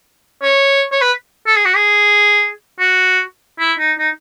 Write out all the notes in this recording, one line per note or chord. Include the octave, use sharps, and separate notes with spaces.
C#5
C#5
B4
A4
G#4
F#4
G#4
F#4
E4
D#4
D#4